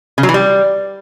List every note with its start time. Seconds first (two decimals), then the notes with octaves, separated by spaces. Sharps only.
0.18 C#3
0.23 F#3
0.29 E3
0.34 G3